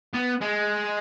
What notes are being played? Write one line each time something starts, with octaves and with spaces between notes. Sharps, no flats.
B3
G#3